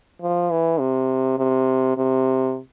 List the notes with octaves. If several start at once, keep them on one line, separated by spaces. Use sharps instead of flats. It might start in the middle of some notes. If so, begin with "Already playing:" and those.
F3
E3
C3
C3
C3